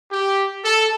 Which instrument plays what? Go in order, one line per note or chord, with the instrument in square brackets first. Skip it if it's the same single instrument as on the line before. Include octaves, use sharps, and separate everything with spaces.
[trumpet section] G4
A4